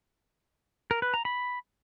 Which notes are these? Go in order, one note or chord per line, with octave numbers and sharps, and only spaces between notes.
A#4
B4
A#5
B5